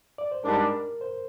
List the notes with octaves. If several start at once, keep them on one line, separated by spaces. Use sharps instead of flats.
D5
C5
G#2 G3 D4 A#4
C5